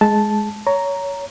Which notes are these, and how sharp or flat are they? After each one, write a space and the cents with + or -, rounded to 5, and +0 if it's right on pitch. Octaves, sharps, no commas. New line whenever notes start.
G#3 +10 A5 -5
C#5 +20 A#5 +0